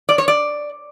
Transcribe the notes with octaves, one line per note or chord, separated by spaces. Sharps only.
D5
C#5
D5